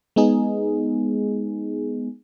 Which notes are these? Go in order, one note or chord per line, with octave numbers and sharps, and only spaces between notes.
G#3 B3 D#4 G#4